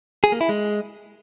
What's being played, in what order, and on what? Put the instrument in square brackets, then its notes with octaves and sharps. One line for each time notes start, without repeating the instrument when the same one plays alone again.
[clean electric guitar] G#4
A#3
E4
G#3